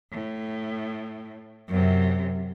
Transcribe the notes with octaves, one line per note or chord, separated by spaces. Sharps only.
A2
F#2 C3